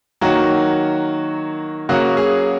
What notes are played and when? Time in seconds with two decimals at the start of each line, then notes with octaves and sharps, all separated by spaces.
0.21 D#3 F#3 A#3 F#4
1.89 C#3 F#3 A#3 F#4
2.17 G#4